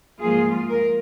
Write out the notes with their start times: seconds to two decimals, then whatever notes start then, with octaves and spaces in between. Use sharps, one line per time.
0.21 G#2 F3 A#3 F4 G#4
0.69 A#4